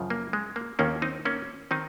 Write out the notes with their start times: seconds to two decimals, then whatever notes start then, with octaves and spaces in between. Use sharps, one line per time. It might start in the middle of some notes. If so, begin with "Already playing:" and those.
Already playing: F#2 C#3 F3
0.10 A#3
0.33 G#3
0.56 A#3
0.79 D#2 D#3 A#3 C#4
1.02 C4 D#4
1.25 A#3 C#4
1.71 D#3 C4 D#4